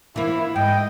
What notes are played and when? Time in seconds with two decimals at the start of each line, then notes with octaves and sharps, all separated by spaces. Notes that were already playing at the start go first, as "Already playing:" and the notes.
0.16 E3 A#3 E4
0.56 G#2 D#5 G5